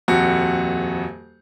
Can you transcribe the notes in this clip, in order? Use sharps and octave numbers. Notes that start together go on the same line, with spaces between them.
D#1 F2 F#4